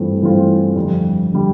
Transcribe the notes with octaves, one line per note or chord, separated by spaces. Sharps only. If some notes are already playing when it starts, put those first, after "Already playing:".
Already playing: G2 E3 A3 C4 F4
G2 E3 A3 C4 F4
F2 D3 G3
D3 G3